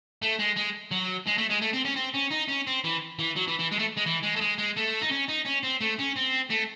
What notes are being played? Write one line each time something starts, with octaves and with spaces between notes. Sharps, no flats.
A3
G#3
G#3
F#3
G#3
A3
G#3
A3
C4
C#4
C4
C#4
D#4
C#4
C4
E3
E3
F#3
E3
E3
G#3
A3
G#3
E3
G#3
A3
G#3
G#3
A3
D#4
C#4
D#4
C#4
C4
A3
C#4
C4
A3